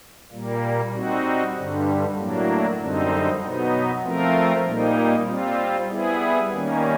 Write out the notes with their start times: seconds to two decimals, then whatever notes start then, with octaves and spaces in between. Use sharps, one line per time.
0.32 A#2 G3 A#3
0.94 G3 C4 D#4 F#4
1.56 G2 D3 G3
2.17 A2 F#3 A#3 D4
2.80 F#2 D3 G3 C4 D#4
3.41 B2 F#3 B3 D#4
4.03 F3 A3 C4 F4 A#4
4.65 A#2 G3 A#3 D#4
5.27 G3 C4 F4
5.89 G3 B3 E4 G#4
6.51 D#3 G3 A#3 C#4